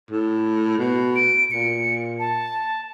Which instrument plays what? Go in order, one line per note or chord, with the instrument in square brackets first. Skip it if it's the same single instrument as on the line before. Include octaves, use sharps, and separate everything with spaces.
[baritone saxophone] A2
B2
[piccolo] D7
[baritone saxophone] A#2 [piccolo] C#7
[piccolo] A5